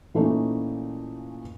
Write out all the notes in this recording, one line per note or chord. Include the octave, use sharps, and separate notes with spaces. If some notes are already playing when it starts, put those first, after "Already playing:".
A#2 E3 A3 C#4 D#4